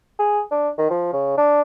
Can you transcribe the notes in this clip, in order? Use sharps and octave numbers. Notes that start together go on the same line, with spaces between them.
G#4
D4
D#3
F3
C#3
D4